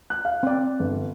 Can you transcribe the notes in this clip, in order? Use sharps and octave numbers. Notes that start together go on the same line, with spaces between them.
F#6
F5
C4 D5
G1